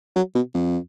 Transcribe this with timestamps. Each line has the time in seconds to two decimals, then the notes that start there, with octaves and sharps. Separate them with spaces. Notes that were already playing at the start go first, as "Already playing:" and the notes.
0.16 F#3
0.35 B2
0.54 F2